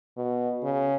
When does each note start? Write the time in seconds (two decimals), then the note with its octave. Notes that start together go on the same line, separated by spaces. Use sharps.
0.17 B2
0.63 C#3